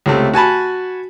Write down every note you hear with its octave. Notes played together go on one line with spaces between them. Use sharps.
C#2 C3 A3
F#4 G#5 A5 B5